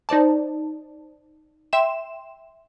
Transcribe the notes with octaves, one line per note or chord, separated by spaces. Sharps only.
D#4 C5 D5 A5
E5 G5 C6 E7